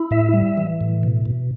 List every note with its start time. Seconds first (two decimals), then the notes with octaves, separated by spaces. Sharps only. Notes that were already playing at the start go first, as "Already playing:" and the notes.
Already playing: E4
0.11 A2 E5
0.34 G3
0.57 E3
0.81 A2
1.03 B2
1.26 B2